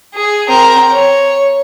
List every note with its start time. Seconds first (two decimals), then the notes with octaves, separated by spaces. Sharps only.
0.15 G#4
0.48 C4 A#4
0.92 C#5